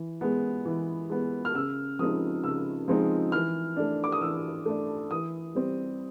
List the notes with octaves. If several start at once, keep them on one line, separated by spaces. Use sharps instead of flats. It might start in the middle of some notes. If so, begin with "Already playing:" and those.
Already playing: E3
G#3 B3
E3
G#3 B3
F6
C#3 E6
F3 G#3 C4 D#4 D#6
C#3 E6
F3 G#3 C4 D#4
E3 F6
A3 D4
D6
D#6
E3 E6
A3 D4
E3 D#6
G3 C4